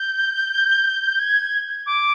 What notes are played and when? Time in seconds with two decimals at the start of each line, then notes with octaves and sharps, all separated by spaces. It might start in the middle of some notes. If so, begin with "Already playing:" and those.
Already playing: G6
1.19 G#6
1.86 D6